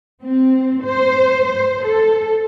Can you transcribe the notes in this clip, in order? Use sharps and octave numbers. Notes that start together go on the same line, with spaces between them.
C4
C5
C5
A4